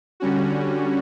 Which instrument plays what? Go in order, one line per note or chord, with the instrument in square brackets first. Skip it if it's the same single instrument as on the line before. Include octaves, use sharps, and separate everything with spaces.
[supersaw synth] D3 G3 C#4 F#4